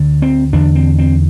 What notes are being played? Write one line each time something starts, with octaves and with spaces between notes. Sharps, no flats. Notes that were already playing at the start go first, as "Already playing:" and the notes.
Already playing: D2 D3
C4
E2 D3 D4
C4
C4